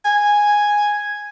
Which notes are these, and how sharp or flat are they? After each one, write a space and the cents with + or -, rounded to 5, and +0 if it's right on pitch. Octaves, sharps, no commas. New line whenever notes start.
G#5 -5